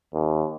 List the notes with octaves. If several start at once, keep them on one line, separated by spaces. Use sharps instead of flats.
D#2